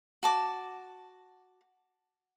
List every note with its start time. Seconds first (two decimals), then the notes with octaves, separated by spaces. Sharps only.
0.23 F#4 A5 D6